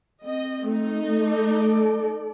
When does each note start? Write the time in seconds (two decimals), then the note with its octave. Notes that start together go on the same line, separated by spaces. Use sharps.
0.24 C4 D#5
0.66 A3 D#4
1.21 A4 D5